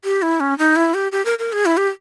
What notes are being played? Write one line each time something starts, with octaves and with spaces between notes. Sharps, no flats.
G4
E4
C#4
D#4
E4
G4
G4
A#4
A#4
G#4
E4
G4